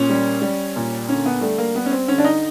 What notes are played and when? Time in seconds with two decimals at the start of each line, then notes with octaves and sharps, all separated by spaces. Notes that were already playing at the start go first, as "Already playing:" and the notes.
Already playing: A#2 C#4
0.09 G3
0.42 G3
0.76 A#2
1.09 D3 C#4
1.26 B3
1.41 G3 A3
1.58 A#3
1.75 G3 B3
1.86 C#4
1.91 C4
2.08 D3 C#4
2.18 D4
2.24 D#4